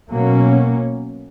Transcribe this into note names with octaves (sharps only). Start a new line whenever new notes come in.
B2 F#3 A#3 C#4